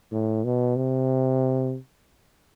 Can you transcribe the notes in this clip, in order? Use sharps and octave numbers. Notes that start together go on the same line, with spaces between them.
A2
B2
C3